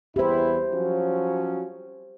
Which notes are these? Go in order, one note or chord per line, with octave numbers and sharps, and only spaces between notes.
E2 E4 G4 C5
F3 F#3 C#4